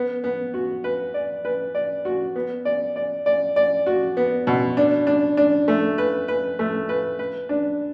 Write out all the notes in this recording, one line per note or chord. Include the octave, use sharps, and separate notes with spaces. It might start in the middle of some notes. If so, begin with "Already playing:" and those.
Already playing: B3
B3
F#4
B4
D5
B4
D5
F#4
B3
D5
D5
D5
D5
F#4
B3
B2
D4
D4
D4
A3
B4
B4
A3
B4
B4
D4